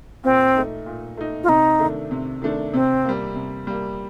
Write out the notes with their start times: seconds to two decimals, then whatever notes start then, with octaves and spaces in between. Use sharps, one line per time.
0.24 A#2 C4
0.55 A3 D#4
0.86 A#2
1.17 A3 D#4
1.43 F4
1.48 C3 D#4
1.79 D#3 A3 D4
2.11 C3
2.42 D#3 A3 D4
2.73 C3 C4
3.05 G3 A#3
3.35 C3
3.67 G3 A#3